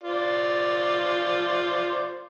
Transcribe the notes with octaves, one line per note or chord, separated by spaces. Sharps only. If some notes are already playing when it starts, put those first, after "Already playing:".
F4 C5 D5